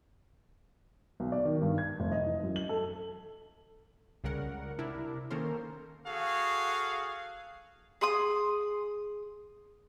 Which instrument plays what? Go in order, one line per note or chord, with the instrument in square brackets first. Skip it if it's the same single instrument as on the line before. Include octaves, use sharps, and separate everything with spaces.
[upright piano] B1
D5
D#3
G2
G#6
F1
D#5
E3
F#2
F#7
A4
[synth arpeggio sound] C#2 C#3 G3 A#4 F#5
C3 D4 E4 A#4
D#3 A#3 C#4 A4 A#4 C5
[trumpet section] F#4 G#4 A4 F5
[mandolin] G#4 C6 D#6